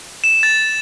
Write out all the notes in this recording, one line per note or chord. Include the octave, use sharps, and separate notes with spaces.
E7
A6